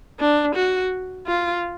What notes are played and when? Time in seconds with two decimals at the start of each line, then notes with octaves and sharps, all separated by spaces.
0.20 D4
0.56 F#4
1.28 F4